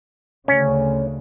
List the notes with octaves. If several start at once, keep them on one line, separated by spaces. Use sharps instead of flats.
D2 C#3 C#4